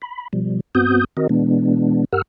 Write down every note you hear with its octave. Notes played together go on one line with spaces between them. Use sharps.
B5
B2 F3 G3
G2 B3 C4 F#4 D#6 G6
D#3 C4 F#4 A#4 D#5
B2 E3 G#3 B3 D4
G2 G4 A#4 F#5 E6 F6